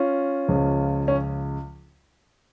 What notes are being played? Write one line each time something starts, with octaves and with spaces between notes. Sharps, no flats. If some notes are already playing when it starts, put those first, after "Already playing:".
Already playing: C#4 F4
C#2 C#3 F3
C#4